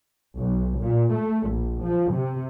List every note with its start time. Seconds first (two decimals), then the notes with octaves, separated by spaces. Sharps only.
0.37 B1
0.80 A#2
1.14 A3
1.49 A#1
1.83 F3
2.14 C3